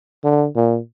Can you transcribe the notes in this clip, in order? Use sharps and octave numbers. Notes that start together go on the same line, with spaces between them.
D3
A#2